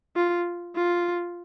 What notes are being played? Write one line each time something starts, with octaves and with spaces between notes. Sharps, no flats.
F4
F4